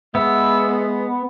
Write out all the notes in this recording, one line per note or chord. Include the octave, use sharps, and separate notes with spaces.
G#3 B3 E5